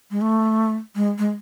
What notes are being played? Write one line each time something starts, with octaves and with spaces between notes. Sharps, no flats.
G#3
A3
G#3
G#3